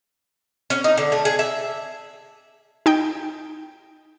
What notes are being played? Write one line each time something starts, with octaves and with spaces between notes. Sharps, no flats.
C#4
D#4
D3
A3
G#4
E5
D#4 G5